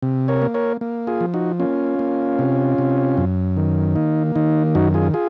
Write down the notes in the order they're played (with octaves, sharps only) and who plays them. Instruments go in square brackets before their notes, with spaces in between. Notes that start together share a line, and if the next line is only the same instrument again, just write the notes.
[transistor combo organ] C3
A#4 C#5
A#3
A#4 C#5
A#3
F4 G#4
F3
D#4 F#4
A#3 C#4 F4
A#3
C3
C3
F#2
D#3
A#3 D#4
D#3 D#4
F#2 D#4 F#4
F4 G#4
F4 G#4